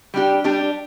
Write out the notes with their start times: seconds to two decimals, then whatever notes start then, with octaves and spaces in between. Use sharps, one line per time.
0.14 G3 D4 G4
0.44 G3 D4 G4